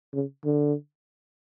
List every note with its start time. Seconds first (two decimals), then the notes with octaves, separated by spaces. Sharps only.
0.14 C#3
0.45 D3